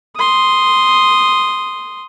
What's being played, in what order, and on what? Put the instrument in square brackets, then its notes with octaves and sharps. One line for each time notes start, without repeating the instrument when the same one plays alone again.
[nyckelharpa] C6 D#6